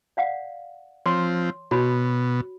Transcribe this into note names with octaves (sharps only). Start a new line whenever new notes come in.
D5 F5 F#5
F3 C4 C#5 C6
B2 F#4 C#5 B5